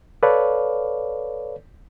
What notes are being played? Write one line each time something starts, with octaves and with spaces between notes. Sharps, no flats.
A4 B4 C#5 D5 F5